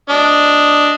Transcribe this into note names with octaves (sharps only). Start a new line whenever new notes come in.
D4 D#5